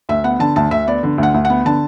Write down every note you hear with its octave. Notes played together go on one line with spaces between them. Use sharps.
D2 E5
B3 F#5
D3 A5
D2 A5
D2 E5
B3 D5
D3
D2
F#5
D2
F#5
B3
D3 A5